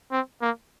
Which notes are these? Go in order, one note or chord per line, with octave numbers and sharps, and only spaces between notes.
C4
A#3